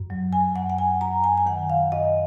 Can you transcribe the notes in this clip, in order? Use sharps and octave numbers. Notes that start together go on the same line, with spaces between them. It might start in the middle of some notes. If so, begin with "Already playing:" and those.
Already playing: F#2
F#3
G#5
F#2 F#5
F#5
G#5
F#2 A#5
G#5
G#5
D#3 F#5
F5
F#2 D#5